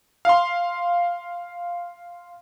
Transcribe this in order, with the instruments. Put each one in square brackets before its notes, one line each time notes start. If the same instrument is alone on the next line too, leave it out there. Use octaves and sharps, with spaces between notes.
[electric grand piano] F5 C6